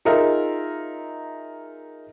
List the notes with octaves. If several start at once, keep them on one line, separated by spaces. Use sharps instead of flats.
D#4 F4 G#4 A#4 E5 F5